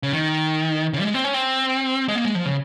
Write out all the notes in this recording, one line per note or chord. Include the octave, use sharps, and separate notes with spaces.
C#3
D#3
C#3
G3
G#3
C4
C#4
C4
G#3
A#3
G#3
F3
C#3